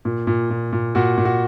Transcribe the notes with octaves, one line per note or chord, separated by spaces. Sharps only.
A#2
A#2
A#2
A#2
A#2 F#4
A#2
F#4